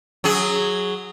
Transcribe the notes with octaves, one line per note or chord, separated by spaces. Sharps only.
F#3 G#4